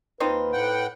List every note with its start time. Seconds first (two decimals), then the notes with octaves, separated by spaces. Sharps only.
0.20 D#2 C4 D#4 F4 B4
0.53 A2 F#5 G5